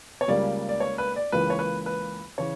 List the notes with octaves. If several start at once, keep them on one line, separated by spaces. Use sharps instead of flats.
C#5
C#2 C#3 G3 A#3 D5
D5
C#5
B4
D5
C#2 C#3 E3 A#3 B4
C#5
B4
B4
C#3 E3 C#5